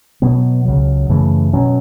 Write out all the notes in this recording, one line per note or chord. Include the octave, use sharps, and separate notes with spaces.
B2 F#3 B3
C#2 C#3 F#3
F#2 C#3 E3 A3
B2 F#3 C#4